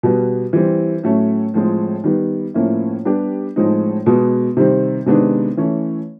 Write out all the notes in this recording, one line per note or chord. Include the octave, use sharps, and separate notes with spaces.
B2 G3 B3
E3 G3 C4
A2 F#3 A3 C#4
A2 F3 G#3 C4
D#3 G3 B3
A2 F3 A#3 C#4 E4
G3 B3 D4 G4
A2 F3 G#3 C4 D#4
B2 G#3 B3
C3 D#3 G3 C4
C3 D#3 G#3 B3 D4
E3 A3 C#4